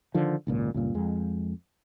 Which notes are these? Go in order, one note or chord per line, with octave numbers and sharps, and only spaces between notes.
D3 D#3 F3
G#1 C#2 A#2
C#2 G2 A#2
F2 G#3